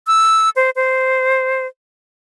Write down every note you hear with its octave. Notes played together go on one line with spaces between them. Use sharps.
E6
C5
C5